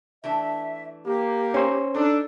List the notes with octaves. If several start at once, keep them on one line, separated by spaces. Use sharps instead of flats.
E3 A3 D4 E5
A#3 G4
C#4 C5 C#5
D4 D#4 A4